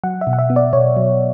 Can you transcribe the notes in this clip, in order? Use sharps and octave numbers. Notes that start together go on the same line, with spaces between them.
F#3 F#5
E5
B2
F#5
E5
B3
D5
B2 C#5
F#3